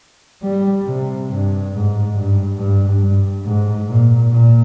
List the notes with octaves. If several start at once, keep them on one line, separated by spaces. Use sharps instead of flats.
G3
C3
G2
G#2
G2
G2
G2
G#2
A#2
A#2